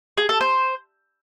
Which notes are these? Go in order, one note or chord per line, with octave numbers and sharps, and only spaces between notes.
G#4
A4
C5